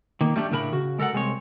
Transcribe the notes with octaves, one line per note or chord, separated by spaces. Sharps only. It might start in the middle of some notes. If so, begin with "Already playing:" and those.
D#3 A#3
G3 A3 D4 G4
A2 C#3 D4 A#4 A5 B5
C#3 F#4
G#3 A4 A#4 F5 F#5
C2 G#3 C4 C#5